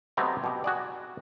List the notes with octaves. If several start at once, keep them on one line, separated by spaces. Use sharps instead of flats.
F#3 A3 B3 C4 G4 D#5
B2 G4
F#4 G#4 D5